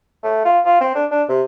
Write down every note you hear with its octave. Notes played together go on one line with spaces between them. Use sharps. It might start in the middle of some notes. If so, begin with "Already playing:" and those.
A3
F4
F4
C4
D4
D4
C3